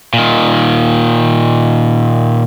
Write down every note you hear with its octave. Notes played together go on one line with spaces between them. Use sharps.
A#2 D#3